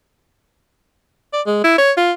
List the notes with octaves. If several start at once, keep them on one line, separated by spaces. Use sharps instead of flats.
D5
G#3
E4
C#5
F4